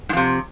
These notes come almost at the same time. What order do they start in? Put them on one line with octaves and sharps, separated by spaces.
G#2 F2 C3